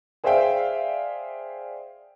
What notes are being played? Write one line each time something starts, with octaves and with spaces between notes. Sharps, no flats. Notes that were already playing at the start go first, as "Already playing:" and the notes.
G#4 C5 D5 E5 F5 G5